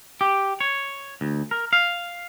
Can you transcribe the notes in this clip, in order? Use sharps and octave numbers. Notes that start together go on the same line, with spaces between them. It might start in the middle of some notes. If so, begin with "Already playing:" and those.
G4
C#5
D2
A#4
F5